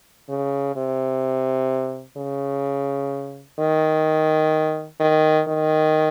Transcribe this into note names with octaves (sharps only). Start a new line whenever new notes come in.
C#3
C3
C#3
D#3
D#3
D#3